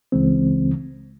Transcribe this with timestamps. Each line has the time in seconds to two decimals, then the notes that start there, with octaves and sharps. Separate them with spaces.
0.12 C#2 C#3 E3 G#3 C4